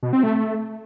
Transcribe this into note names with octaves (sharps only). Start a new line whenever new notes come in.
B2
C4
A3